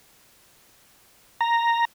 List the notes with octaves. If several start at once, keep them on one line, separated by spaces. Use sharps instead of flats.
A#5